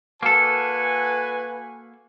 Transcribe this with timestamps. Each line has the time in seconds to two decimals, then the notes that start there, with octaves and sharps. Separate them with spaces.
0.23 A#3 F#4 A4 B4 G#5